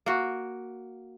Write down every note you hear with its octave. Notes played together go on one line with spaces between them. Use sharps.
A#3 F#4